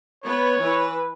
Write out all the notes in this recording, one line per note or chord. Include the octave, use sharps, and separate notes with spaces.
B3 B4 C#5
E3 B4